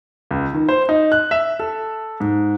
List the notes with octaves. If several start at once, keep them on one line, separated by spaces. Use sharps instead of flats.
C#2
D#3
C5
D#4
F#6
E5
A4
G#2